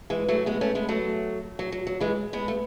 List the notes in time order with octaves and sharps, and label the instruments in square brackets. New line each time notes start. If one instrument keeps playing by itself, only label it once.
[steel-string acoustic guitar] E3 G#3
F#3 A3
G#3 B3
A3 C#4
G#3 B3
F#3 A3
F#3
F#3
F#3
E3 G#3
G#3 B3
A3